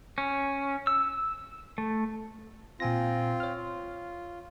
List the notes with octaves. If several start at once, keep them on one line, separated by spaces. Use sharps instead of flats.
C#4
E6
A3
A#2 C4 F4 G#5 A#6
C#5 F6
F4